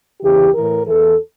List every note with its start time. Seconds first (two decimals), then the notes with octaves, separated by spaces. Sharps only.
0.22 E2 C#3 E3 G4
0.54 A2 E3 A#4
0.86 E2 E3 A4